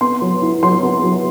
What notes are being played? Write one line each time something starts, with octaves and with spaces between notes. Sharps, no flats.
B3 C6
F#3
E4
F#3 C6
B3
F#3